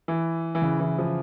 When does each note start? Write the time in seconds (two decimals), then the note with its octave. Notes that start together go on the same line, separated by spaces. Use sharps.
0.08 E3
0.55 E3
0.62 C#3
0.80 E3
0.98 F3